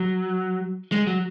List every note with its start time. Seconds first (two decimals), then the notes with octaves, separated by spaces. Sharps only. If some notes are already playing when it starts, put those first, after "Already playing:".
Already playing: F#3
0.92 G#3
1.07 F#3